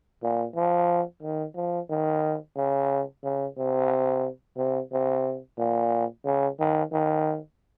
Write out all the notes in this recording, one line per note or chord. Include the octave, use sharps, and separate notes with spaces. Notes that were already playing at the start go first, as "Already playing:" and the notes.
A#2
F3
D#3
F3
D#3
C#3
C#3
C3
C3
C3
A#2
C#3
D#3
D#3